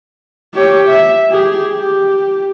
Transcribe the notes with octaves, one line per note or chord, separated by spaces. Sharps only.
G4 C#5
E5
G4 G#4
G4